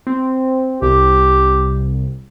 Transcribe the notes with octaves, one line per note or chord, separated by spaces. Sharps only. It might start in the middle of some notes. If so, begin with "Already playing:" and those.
C4
C2 G4